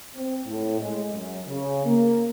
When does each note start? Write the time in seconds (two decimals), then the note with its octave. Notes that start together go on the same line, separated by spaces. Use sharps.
0.16 C4
0.46 A2
0.80 G#3
1.14 F#2
1.47 C#3
1.85 A#3